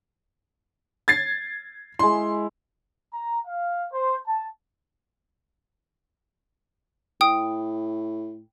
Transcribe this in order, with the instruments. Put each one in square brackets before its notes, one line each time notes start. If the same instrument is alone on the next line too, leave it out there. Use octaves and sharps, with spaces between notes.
[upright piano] G#6 A6 C7
[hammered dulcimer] G#3 E4 [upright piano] C6
[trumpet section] A#5
F5
C5
A5
[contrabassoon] A2 [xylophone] G5 D#6